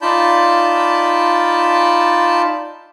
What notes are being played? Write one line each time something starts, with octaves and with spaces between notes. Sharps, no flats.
D#4 F4 D5 A5 B5 G6